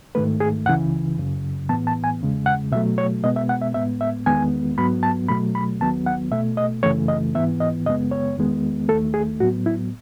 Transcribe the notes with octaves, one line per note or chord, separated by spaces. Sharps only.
G#2 D#3 A3 B4
G#4
C#2 C#3 E3 F#5
F#2 C#3 F#3
A2 E3 B3 A5
A5
G#5
E2 C#3 G#3
F#5
B2 F#3 A3 E5
C#5
B2 G#3 B3 D#5
E5
F#5
E5
A2 G#3 B3 E5
E5
E2 D#3 G#3 B3 G#5
G#2 F#3 B3 B5
A5
B2 F#3 A3 B5
B5
D#2 D#3 F#3 B3 A5
F#5
B2 A3 E5
D#5
F#2 C#3 E3 A3 C#5
D#5
G#2 E3 B3 E5
D#5
F#2 C#3 G#3 B3 D#5
C#5
E2 D#3 G#3 B3
D#2 D#3 A3 A4
G#4
A2 F#3 B3 F#4
E4